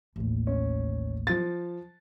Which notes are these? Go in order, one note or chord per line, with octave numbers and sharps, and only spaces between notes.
A1 D#2
C#4
F3 A6